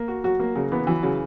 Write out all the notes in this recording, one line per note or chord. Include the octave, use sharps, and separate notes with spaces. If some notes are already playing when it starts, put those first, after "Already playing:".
Already playing: A#3
F#4
F#3 F#4
F#3 A#3
C#3 F#3
E3 B3
E3 F#3
C#3 F#3